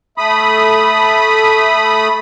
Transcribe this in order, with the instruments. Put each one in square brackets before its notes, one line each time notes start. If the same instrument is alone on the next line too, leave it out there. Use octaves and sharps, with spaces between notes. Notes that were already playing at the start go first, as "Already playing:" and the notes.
[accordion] A3 B5 D#6